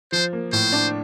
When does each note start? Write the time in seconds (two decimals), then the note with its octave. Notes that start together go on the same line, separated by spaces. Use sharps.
0.12 F3 C5
0.33 A#3
0.53 A2 C5
0.72 D4